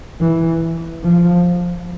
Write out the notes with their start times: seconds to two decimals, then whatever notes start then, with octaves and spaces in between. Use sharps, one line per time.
0.21 E3
1.04 F3